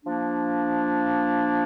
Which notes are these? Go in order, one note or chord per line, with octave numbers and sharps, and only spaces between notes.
F3 A#3 D4